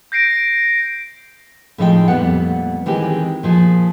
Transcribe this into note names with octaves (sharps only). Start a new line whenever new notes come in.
G6 A#6 C7 D7
A2 F3 G#3 D#4 C5 G5
F2 A#2 G3 B3 F#5
D#3 E3 G#3 C4 G4
A#2 F3 G#4